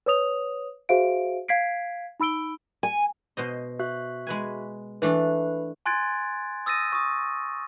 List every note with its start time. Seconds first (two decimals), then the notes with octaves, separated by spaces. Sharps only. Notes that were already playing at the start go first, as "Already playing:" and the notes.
0.06 B4 C#5 D#6 F7
0.89 F#4 G#4 C5 E5 F5 D7
1.48 F5 G#6 B6 C7 D7
2.20 D#4 B5 E6 D7 G7
2.83 G#5
3.37 B2 C5 D#5
3.79 F#4 E5 F#6
4.27 G#3 B4 G#5
5.02 E3 A3 D4 B4
5.86 G#5 C6 F#6 G#6 A6 D7
6.66 D#6 E6 A6 A#6 D#7
6.92 C#6 D#6